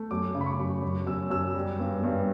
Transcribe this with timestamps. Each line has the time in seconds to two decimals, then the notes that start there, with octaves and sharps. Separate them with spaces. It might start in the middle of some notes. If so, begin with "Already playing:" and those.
Already playing: A3
0.11 F#2 D6
0.35 C#3
0.41 B5
0.46 C#6
0.59 F#2
0.82 F#2
1.07 F#2 E6
1.30 F#2 E6
1.54 G3
1.79 G2
2.04 G2